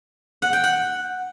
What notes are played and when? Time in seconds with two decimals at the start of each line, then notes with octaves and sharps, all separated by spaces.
0.42 F#5
0.53 G5
0.64 F#5